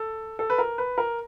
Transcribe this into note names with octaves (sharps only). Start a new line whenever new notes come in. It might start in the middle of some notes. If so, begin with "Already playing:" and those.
Already playing: A4
A4
B4
A#4
B4
A#4